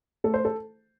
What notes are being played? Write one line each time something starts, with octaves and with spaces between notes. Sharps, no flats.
A3 A4
C5
A4